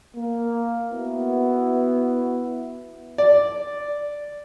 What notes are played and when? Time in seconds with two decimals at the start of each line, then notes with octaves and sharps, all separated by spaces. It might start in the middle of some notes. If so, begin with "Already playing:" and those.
0.17 A#3
0.92 B3 E4 F#4
3.18 D5